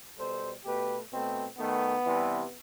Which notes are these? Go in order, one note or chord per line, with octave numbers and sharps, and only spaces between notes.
B2 G3 A4 C5
B2 A3 G4 B4
B2 A3 C4
D#3 A3 B3
C3 E3 G3